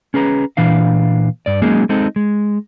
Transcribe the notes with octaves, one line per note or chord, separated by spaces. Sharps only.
C#4 G#4 B4 A#5
A#2 E3 D4 F5
G2 D5
F#3 G#3 A#3 C#4 D#4 G#4
G#3 C4 D#4 A4
G#3